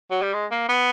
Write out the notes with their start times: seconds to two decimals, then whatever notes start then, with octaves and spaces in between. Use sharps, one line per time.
0.11 F#3
0.22 G3
0.33 G#3
0.51 A#3
0.69 B3